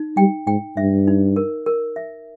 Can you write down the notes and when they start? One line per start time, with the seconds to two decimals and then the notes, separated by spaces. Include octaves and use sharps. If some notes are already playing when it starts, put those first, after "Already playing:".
Already playing: D#4
0.17 G3 G5
0.47 G#2 G5
0.77 G2 E5
1.08 D#4
1.36 A#4
1.66 A#4
1.96 E5